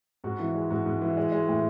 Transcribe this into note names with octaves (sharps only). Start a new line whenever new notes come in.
G#2 F#4
E3
G#3
G#2 F#4
G#2
E3
G#3
G#3
A2